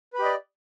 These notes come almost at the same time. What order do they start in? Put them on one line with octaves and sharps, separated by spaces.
B4 B5 G4 D#5 D5